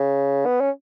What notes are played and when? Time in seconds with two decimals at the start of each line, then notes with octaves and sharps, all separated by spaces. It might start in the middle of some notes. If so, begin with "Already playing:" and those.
Already playing: C#3
0.46 B3
0.61 C#4